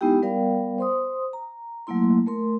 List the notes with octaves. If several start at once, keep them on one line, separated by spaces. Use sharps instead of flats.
G#3 B3 D#4 E4 G4 G5
G3 B3 A#4 D5 F5 G5
C5 C6 D#6
A#5
F#3 A3 A#3 E4 C6
A3 A#4 C6